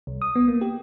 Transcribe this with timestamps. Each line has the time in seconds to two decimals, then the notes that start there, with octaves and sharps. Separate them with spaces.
0.07 C2
0.22 D#6
0.35 B3
0.48 A#3
0.61 G4